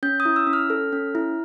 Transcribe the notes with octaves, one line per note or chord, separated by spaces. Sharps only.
C#4 G6
D#6
E4
E6
C#4
F6
A4
C#4
E4